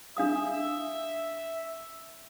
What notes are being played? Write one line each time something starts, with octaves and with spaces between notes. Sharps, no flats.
D4 E5 F5 D#6